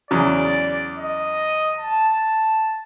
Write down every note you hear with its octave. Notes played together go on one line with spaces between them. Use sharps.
E2 C#3 F#3 D5
D#5
A5